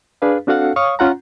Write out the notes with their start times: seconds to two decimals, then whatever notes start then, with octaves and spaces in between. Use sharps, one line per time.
0.22 D4 G#4 B4 F5
0.47 C4 D4 F#4 A4 F5 F#5
0.76 C#5 F5 C#6 D#6
0.99 C#4 F4 F#5 A#5